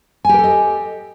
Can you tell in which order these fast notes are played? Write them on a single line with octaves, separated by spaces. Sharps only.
G#5 G4 A#4 A4 D#5